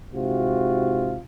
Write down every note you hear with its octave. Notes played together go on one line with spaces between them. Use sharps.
G#2 C3 F4 F#4